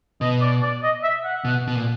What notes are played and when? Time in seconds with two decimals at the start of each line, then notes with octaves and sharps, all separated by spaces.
0.21 B2 D#5
0.42 D5
0.63 D5
0.83 D#5
1.03 E5
1.24 F#5
1.45 B2
1.68 B2
1.75 A#2